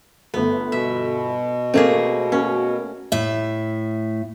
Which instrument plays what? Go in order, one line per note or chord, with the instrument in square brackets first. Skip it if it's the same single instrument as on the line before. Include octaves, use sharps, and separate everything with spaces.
[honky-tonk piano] G1 A3 A4 [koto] B3
[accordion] B2 [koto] E5
[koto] A3 A#3 G#4 [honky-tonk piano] C4
[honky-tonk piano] A#3 F#4 [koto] C#4
[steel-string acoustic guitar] A2 E5